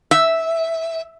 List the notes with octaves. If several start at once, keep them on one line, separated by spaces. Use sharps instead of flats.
E5